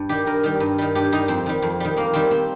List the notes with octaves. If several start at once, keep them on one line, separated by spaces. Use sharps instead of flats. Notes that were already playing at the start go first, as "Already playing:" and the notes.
Already playing: G2
D#3 G3 G4
G2 A#4
D#3 G3
G2
D#3 G3
G2 G4
D#3 G3 D#4
F2 C4
D#3 G3
F2
D#3 G3
F2 A#3
D#3 G3 C4
C4